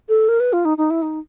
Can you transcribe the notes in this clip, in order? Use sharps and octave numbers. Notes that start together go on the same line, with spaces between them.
A4
A#4
B4
F4
D#4
D#4
E4
D#4